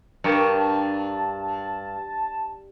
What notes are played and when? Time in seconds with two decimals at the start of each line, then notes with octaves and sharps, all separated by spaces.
0.24 G2 G4 A#4 A5 C#6